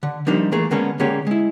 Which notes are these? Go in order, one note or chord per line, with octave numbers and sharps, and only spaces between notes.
D3
F3 G3 A#3 D4 D#4
E3 A3 A#3 G#4
D3 G#3 A#3 B3 C#4
D3 G#3 A#3 C#4 G4 G#4
G#3 E4